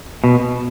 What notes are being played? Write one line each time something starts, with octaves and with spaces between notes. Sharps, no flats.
B2